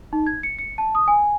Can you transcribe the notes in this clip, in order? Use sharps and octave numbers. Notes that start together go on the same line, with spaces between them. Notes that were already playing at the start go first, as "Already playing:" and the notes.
D#4
G#6
C#7
C#7
A5
D#6
G#5